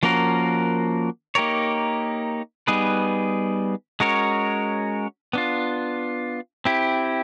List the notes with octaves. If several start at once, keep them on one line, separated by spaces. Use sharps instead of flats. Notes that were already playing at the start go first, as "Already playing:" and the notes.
F3 A#3 C#4 F#4 A#4
A#3 D#4 G4 A#4 C#5
G3 B3 D#4 G#4 B4
G#3 C#4 F#4 A#4 C#5
B3 D4 F4
C4 E4 G4